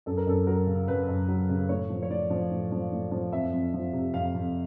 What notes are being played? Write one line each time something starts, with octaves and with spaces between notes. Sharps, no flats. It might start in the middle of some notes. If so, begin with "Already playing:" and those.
F#2 A4
A#4
F#2 A4
F#3 A#4
C#3
F#2 B4
F#2
F#3
C#3
A2 C#5
F3
C#5
A2 D5
F3
A2
F3
A2
F3
F2 E5
F2
F3
C3
F2 F5
F2